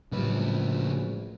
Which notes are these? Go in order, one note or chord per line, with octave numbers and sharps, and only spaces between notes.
A#1 A2 C#3 F#3 G3 B4